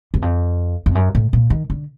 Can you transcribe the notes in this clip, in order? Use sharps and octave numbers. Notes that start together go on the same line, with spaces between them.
E2
F2
F2
F#2
A2
A#2
D#3
D3